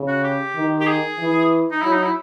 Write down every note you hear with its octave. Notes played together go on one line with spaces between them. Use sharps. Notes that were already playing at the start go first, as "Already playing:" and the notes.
Already playing: C#3
F#4
G4
D#3
G4
G#4
E3
D#4
F#3 E4
D#4
E4